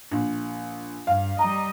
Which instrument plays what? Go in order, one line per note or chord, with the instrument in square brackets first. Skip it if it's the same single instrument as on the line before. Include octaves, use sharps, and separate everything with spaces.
[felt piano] A#1
[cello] G2 [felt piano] F5
[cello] G3 D#5 [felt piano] A#5